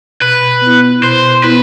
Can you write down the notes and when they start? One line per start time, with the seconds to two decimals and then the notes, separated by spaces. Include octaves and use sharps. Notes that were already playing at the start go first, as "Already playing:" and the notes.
0.21 B2 B4
0.61 B3 E4
1.02 B2 C5
1.44 B3 E4 B4